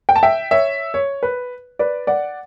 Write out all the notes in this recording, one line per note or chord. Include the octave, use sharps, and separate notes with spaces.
G5
A5
E5 G5
C#5 E5
C#5
B4
B4 D5
D5 F#5